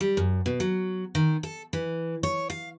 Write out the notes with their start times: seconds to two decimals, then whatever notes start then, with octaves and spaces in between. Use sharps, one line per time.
0.01 G3
0.17 F#2
0.46 B2
0.60 F#3
1.15 D#3
1.43 A4
1.73 E3
2.23 C#5
2.50 F5